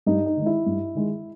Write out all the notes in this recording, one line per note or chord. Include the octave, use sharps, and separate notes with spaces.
G2 D#4
D#4
D#3 G#3
E4
G2
D#3 G#3